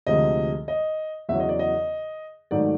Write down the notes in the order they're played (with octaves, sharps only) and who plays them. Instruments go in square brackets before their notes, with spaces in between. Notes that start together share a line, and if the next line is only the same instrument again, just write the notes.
[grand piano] D2 C3 F3 G#3 D#5
D#5
E2 C#3 F#3 E5
D#5
D5
D#5
G#2 D#3 F#3 A3 D5